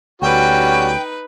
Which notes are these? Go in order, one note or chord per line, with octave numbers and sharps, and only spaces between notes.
D2 G3 C#4 D#4 F#4 B4 G5